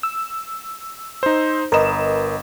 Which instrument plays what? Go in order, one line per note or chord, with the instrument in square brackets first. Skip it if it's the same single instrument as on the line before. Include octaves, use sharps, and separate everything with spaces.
[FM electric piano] E6
[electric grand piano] D#4 C5
[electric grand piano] G1 E7 [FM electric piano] A#4 B4 D#5